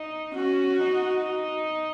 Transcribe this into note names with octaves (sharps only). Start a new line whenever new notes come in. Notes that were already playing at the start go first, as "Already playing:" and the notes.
Already playing: D#4
C#4 F#4
D#4